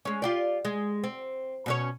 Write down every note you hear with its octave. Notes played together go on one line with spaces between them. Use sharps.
G#3 C#4
F4 G4 D5
G#3
C4
B2 C#4 C#5